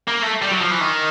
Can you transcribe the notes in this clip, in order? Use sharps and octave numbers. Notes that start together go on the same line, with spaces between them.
A#3
A3
G3
F#3
F3
E3
D#3